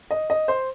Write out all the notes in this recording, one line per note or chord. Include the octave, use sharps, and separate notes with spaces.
D#5
D#5
C5